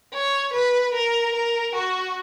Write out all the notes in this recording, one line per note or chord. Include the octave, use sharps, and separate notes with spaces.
C#5
B4
A#4
A#4
F#4